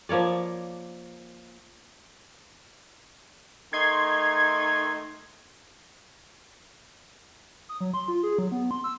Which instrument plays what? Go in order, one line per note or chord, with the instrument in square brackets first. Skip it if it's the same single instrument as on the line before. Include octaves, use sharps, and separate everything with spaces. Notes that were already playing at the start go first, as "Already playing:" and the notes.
[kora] F3 A#3 C#5 D5
[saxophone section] D#3 A3 D#4 [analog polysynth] C6 G#6
[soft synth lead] D#6
F#3
C6
F4
G#4
F#3
B3
C6
E6